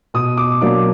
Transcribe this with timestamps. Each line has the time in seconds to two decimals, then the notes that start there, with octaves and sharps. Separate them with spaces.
0.14 B2 D#6
0.37 D6
0.61 F#3 A#3 D4 D6